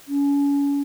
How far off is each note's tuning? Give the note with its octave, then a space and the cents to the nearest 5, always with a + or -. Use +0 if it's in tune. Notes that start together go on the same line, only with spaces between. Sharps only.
C#4 +35